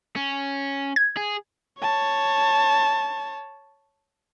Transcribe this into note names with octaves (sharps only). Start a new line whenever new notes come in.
C#4
G#6
G#4
C#5 A5